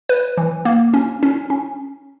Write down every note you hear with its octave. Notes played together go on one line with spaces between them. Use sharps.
B4
E3
A#3
C#4
C#4
C#4